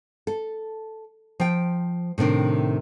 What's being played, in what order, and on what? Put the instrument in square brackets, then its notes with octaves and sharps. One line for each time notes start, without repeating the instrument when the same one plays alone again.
[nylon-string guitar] A4
F3 G5
A2 C3 D#3 D4